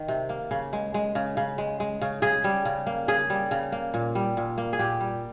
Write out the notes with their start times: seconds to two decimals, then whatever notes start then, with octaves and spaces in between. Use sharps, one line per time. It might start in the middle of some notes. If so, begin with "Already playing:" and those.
Already playing: D#3
0.08 C3
0.29 A#3
0.51 C#3
0.73 G#3
0.94 G#3
1.15 C#3
1.37 C#3
1.58 G#3
1.80 G#3
2.02 C#3
2.22 C#3 G#4
2.44 G3
2.65 C#3
2.87 A#3
3.08 C#3 G#4
3.30 G3
3.51 C#3
3.72 A#3
3.94 A#2
4.15 G3
4.37 A#2
4.58 A#3
4.73 G#4
4.79 A#2 G4
5.00 G3